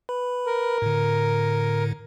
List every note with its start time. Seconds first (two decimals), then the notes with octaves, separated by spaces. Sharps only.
0.09 B4 B5
0.46 A#4
0.82 A2 D3